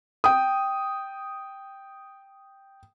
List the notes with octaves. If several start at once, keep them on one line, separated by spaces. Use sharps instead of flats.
G5 D#6